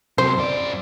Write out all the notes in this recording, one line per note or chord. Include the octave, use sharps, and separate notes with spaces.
C3 F#3 C5
F#2 D5